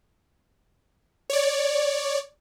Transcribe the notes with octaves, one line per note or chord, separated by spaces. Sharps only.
C#5 D5